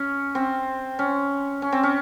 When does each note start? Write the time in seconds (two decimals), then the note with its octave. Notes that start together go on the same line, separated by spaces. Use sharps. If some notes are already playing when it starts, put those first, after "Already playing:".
Already playing: C#4
0.35 C4
0.99 C#4
1.62 C#4
1.72 C4
1.83 C#4